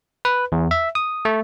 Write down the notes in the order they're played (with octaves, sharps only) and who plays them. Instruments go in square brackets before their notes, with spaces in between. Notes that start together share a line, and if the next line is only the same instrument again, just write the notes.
[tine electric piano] B4
E2
E5
D#6
A3